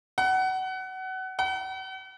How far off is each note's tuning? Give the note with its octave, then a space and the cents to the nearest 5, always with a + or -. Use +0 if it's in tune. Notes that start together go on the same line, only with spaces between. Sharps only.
F#5 +25
F#5 +40